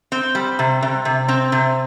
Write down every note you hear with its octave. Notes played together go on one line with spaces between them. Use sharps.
C4
G3
C3
C3
C3
C4
C3